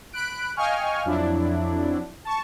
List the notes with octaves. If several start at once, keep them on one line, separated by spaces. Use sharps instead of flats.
B5 F#6 D7
D#5 F5 G5 G#5 C#6 F6
F2 F#3 D4 E4
A5 C#6